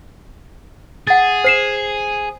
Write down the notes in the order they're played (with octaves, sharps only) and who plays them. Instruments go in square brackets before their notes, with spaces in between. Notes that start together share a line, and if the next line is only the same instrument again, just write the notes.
[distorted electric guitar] G#4 [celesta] F#5 A6
[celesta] C5 C7 E7